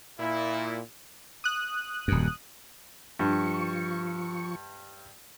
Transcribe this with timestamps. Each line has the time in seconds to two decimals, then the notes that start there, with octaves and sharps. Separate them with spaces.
0.19 A#2 E4
1.44 D#6 F#6
2.08 D#1 F#2
3.19 G2 F3 C#6